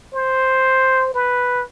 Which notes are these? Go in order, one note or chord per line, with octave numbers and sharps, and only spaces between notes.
C5
B4